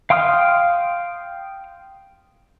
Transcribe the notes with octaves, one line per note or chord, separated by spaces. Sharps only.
F5 G5 C6 D#6 F6